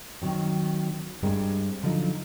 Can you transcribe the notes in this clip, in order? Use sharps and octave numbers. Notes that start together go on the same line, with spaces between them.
D#3 F#3 C4
G2 G3 G#3 C4 A#4
D3 F3 F#3 D#4